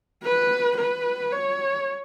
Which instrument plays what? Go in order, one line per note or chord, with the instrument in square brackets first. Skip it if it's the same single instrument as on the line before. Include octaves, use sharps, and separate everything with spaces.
[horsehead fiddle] B4
B4
C#5